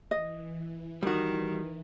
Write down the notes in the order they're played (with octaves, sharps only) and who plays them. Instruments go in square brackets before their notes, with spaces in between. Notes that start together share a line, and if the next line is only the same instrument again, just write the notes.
[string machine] E3 [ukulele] D#5
[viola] D#3 [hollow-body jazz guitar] G3 F#4